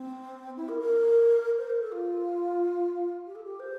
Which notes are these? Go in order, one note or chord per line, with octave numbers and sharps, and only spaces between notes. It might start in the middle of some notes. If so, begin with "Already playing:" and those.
Already playing: C4
E4
A#4
A#4
C5
A#4
A4
F4
G4
A4
G4
C5